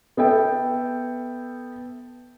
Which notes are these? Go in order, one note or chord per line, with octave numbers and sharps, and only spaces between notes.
B3 A4 E5 G5